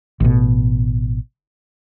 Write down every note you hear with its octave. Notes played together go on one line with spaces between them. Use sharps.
A1 B2